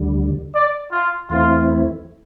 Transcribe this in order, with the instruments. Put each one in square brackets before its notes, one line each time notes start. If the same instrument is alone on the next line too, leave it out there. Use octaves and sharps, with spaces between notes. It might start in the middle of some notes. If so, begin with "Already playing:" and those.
Already playing: [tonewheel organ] D2 D3 G3
[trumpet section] D5
F4
[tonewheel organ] E2 E3 A3 C4 E4 [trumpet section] F4